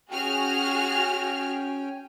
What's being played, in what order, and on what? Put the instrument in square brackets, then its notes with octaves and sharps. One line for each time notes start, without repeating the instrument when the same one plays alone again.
[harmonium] C#4 G5 G#5 [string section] F#4 G#4 F6